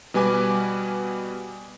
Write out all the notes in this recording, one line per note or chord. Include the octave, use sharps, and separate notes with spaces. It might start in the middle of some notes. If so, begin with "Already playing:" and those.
B2 G3 B4 G#5 D6